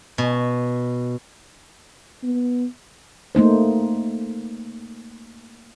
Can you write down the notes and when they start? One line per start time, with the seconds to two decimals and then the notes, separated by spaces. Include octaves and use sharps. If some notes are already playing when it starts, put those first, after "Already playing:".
0.18 B2
2.23 B3
3.35 A3 A#3 D#4 C5